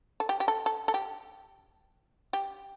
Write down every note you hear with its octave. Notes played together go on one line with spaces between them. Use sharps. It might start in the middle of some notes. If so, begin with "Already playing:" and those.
A4
G4
G4
A4
A4
A4
G4
G4